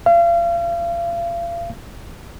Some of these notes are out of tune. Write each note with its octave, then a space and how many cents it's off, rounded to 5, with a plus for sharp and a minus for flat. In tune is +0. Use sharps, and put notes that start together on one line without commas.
F5 -35